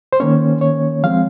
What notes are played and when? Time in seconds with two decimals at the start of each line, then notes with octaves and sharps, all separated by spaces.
0.13 C5
0.20 D#3 A#3 C#4 C#5
0.61 C#5
1.03 F3 G#3 C4 F5